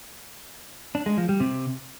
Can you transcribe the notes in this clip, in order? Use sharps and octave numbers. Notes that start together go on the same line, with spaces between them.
D4
G#3
F3
G3
C3